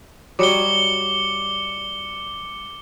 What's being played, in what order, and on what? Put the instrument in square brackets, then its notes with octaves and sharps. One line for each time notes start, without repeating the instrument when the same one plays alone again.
[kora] F#3 G3 D#5 [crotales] D6 C#7 G7